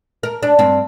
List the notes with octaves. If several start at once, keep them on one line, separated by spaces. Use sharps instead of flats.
A#4
D4
G2 C4